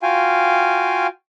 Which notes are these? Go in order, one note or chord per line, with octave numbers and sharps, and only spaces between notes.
F4 F#4 F5 G5 G#5